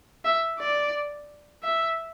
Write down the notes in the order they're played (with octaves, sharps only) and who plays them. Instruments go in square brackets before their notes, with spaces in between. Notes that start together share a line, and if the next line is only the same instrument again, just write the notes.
[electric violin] E5
D5
E5